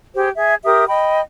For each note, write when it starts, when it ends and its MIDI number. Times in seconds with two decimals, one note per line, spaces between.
0.15 0.30 67
0.15 0.30 68
0.15 0.30 72
0.36 0.55 68
0.36 0.55 76
0.65 0.85 67
0.65 0.85 70
0.65 0.85 76
0.65 0.85 87
0.88 1.21 75
0.88 1.21 79
0.88 1.21 83